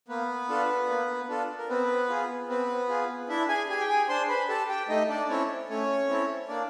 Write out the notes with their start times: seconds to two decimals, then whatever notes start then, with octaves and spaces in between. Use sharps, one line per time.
0.08 A#3 B3 B4
0.49 D4 F4 A4
0.89 A#3
1.28 D4 F4 A4
1.58 A#4
1.69 B3 C4 B4
2.09 F4 G#4
2.49 B3 C4 B4
2.88 F4 G#4
3.29 D4 E4 E5
3.48 G#4 G#5
3.69 G4 G#4 G#5
3.80 G5
3.89 G#4 G#5
4.09 D4 C5 C6
4.29 B4 B5
4.48 G4 A4 A5
4.69 G4 G5
4.88 A3 D#4 D#5
5.09 D4 D5
5.29 C4 C#4 E4 A4 C#5
5.69 A3 C#4 C#5
6.08 C4 E4 A4
6.48 A#3 D4 D5